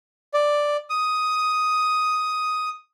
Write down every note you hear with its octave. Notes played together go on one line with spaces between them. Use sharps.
D5
D#6